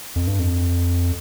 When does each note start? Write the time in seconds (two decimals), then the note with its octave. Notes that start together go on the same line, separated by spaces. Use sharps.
0.16 F2
0.27 G2
0.39 F2